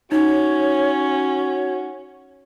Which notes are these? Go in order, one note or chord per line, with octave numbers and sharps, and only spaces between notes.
C#4 D#4 F#4 C#5